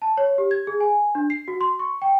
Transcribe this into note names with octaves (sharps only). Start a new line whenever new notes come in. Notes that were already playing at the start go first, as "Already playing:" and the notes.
A5
C#5
G4
G#6
G#4
G#5
D4
C7
F#4
C6
C#6
G5